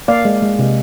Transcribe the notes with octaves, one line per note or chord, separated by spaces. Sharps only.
A#3 D5 F5
G#3
G#3
C3